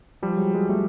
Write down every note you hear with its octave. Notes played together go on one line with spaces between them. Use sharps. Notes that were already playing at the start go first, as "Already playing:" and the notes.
F3 G3
F#3 G#3
F#3 G#3
G3 A3